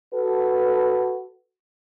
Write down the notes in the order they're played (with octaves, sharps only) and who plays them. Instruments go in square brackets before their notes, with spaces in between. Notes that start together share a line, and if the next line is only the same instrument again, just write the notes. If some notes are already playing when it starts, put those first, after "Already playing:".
[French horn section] F#4 A4 B4